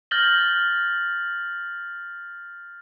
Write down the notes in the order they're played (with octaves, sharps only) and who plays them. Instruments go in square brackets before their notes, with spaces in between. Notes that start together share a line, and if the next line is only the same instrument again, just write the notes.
[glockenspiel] F6 G6 A6 A#6 F#7 G7